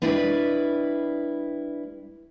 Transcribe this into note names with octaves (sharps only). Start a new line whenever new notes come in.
G3 D4 E4 B4 D5 D#5